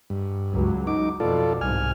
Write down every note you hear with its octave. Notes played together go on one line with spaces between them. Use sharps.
G2
C#2 F#3
D#4 D6
F2 B2 F4 A4 D5
C2 G#2 G#5 F6